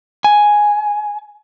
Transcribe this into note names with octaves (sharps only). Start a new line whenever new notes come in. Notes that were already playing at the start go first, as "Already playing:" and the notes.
G#5